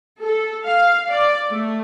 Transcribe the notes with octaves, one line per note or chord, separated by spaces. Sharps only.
A4
F5
D5
A3